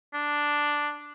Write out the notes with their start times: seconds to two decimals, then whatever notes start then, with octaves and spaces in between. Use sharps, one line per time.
0.14 D4